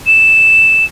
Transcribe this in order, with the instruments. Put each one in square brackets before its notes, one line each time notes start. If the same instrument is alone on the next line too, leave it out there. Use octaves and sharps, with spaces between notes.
[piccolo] E7